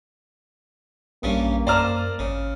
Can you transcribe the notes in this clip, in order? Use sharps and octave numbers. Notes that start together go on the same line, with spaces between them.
A#1 G2 G3 A#3 C#4
F#2 C5 D5 A5 A#5 D#6 F6
G#1 C#3